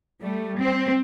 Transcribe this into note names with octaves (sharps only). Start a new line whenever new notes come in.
G3 A3
C4